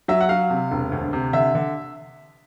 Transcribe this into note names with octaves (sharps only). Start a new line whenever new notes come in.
F#3 E5
F#5
F#3 F5
C3
E1
D2
C3
D3 E5
D3